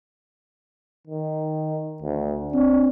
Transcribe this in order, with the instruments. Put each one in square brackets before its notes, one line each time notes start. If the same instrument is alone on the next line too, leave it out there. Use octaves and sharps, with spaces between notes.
[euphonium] D#3
D2
[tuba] C4 [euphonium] D4